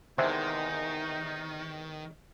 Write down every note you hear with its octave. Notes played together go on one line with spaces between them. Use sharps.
E2 C3 D#3 G#3 D#4 C5 E5